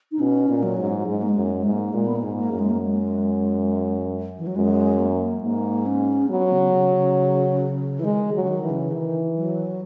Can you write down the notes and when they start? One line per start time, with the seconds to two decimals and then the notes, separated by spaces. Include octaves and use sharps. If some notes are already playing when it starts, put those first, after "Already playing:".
0.11 D#4
0.19 B2 C#4
0.49 A#2
0.63 F#3
0.78 G#2
0.98 F#3
1.06 G#2 G#3
1.22 A#3
1.29 G#3
1.35 F#2
1.61 G#2 G#3
1.72 A#3
1.94 A#2 G#3
2.06 B3
2.16 A#3
2.22 G#2
2.37 A#3
2.51 F#2
2.59 G#3
2.70 A#3
2.82 G#3
4.38 E3
4.47 F#3
4.55 F#2 G#3
4.99 A#3
5.43 G#2 A#3
5.86 C#4
6.30 F#3 B3
6.52 C#3
6.74 C#3
6.95 C#3
7.99 E3
8.04 D#3 G#3
8.26 D#3
8.33 F#3
8.41 C#3
8.48 D#3
8.63 E3
8.70 C#3
8.92 D#3 E3
9.35 F#3